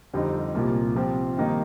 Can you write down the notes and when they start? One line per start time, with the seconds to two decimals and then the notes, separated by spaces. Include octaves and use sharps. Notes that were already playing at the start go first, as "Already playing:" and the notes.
0.13 F2 D3 G3 C4 D#4
0.55 C2 A#2 F3 A#3
0.96 C3 F3 C4
1.37 G2 D#3 A#3 D#4